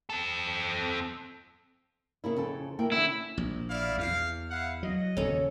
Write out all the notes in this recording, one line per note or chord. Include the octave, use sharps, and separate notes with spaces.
C4 A4
C#3 A#3 E4
F2 C#3 A4
A#3 E4 G5
D3 C#4 E4
A#1
E4 D5 F5
E2 F5
E4 F5 F#5
F#3 D#5
D#1 C#3 C#4 A4